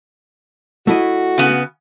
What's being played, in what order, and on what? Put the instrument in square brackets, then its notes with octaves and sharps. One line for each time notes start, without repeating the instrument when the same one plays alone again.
[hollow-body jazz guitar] A3 E4 D#5 [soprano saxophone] F#4
[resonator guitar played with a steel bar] C#3 B3